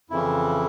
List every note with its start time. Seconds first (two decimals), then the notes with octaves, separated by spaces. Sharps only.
0.10 F2 C#3 E3 E4